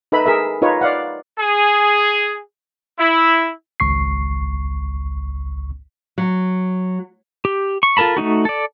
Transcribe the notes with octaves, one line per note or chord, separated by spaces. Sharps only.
D#4 A4 B4 E5 B5
G#4 A#4 E5
D#4 F4 B4 C#5
D5 F5 F#5
G#4
E4
G#1 C#2 C#6 C7
F#3
G4
C#6
F4 A4 A#4 A5 B5
A3 D4 D#4 F#4
A4 D5